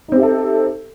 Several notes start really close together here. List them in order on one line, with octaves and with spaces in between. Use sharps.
D#4 C4 G4 E5 A4